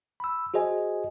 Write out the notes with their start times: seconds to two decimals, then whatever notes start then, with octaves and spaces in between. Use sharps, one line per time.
0.20 B5 E6
0.54 F#4 G#4 C5 D#5 G#5